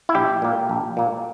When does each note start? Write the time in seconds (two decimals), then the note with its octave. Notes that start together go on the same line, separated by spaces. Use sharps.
0.09 E4
0.15 A#1 G4
0.42 A#2 A#3
0.69 A#1
0.97 A#2 A#3